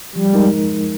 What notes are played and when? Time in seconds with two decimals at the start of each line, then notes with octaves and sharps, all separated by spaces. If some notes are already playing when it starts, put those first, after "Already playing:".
0.15 F3 G3
0.33 G#3 D#4 A#4